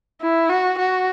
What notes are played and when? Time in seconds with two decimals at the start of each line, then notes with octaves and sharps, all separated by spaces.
0.21 E4
0.49 F#4
0.79 F#4